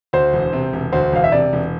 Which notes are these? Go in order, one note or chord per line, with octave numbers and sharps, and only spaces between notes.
D2 C5
E1
C3
E1
D2 C5
E1 F5
E5
C3 D5
E1